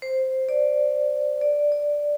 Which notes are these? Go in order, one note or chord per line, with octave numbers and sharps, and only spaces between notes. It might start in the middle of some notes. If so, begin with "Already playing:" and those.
C5
D5
D5
D5